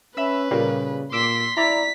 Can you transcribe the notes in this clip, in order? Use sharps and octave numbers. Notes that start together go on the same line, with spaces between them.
C#4 B4 E5 B5 E6
A#2 C#3 G3 A#3
A#2 C6 D6 E6 B6 D7
E4 D5 A#5 B6